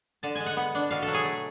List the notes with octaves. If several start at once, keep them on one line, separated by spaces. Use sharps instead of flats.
D3 A5
G#3 G#5
F#5
B3 F#5
D4
B2 F5
F#3 A4
G#4
A3